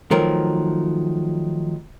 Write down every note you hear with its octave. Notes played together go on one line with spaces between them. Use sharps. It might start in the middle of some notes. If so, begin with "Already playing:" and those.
D#3 F3 F#3 A3 A#4